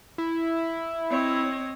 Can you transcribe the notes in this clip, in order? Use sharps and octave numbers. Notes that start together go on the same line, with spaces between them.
E4
C4 C#5 D#5